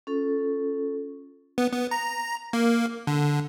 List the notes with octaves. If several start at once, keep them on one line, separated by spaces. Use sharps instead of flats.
C#4 F4 A4
B3
B3
A#5
A#3
D3